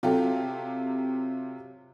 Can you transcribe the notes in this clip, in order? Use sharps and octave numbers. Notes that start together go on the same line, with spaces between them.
C3 F#3 F4 G4 A4